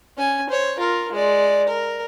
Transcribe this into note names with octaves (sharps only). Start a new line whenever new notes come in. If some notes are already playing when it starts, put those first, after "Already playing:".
C#4 G#5
C5 C#5
F4 A#4
G#3 D5
A#4